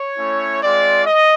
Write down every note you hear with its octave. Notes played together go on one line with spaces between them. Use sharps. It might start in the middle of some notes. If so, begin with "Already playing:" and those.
Already playing: C#5
A3 C#4 E4
G#3 C4 F4 D5
D#5